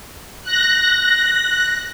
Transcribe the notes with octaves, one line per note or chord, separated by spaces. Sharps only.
F#6 A#6